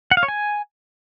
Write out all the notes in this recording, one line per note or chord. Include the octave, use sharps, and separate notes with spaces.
F#5
F5
C#5
G#5